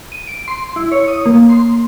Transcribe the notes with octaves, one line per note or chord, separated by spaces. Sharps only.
D#7
D7
C6
E4
C#5
D#6
A#3
C6